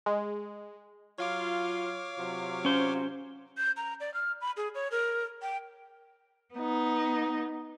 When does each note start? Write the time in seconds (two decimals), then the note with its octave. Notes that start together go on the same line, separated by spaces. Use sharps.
0.06 G#3
1.18 F#3 F4 C#5 F5 D6
2.19 C3 F#3 F4
2.65 C#4 C5
3.57 G6
3.77 A#5
4.00 D5
4.14 F6
4.41 B5
4.57 G#4
4.75 C#5
4.91 A#4
5.42 G5
6.54 B3 D#4